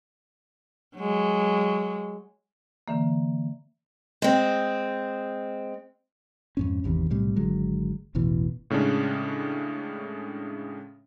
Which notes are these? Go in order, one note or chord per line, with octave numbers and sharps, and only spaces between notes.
F#3 G#3
D3 E3 A#3
G#3 C4
F2 G#2 C#4
G#1 E2 C3 D#3
B1 A2 C3 G3
G#1 D3 F#3 G#3
E1 A1 B2 E3
A2 C#3 G#3 C#4 D4